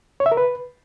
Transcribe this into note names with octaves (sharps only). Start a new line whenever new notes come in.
C#5
E5
A#4
B4